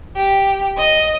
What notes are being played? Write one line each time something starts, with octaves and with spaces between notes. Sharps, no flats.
G4
D#5